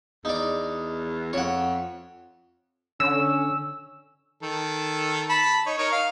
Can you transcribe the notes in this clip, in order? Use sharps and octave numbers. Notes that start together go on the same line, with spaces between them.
E2 D#4 D5
F2 C#5 F#5
D3 C#4 E6
D#3 A4
A5 B5
D#4 C#5
D#4 A#4 C#5
F5